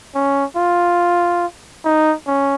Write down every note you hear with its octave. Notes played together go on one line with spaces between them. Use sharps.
C#4
F4
D#4
C#4